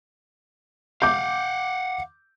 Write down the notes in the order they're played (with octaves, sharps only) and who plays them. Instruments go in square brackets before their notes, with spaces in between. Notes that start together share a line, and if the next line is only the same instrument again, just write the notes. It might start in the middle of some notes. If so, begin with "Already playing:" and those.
[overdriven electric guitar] F5 F#5 [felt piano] D6 G6